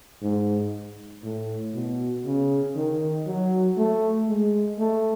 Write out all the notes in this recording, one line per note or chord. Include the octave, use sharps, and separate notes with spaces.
G#2
A2
B2
C#3
D#3
F#3
A3
G#3
A3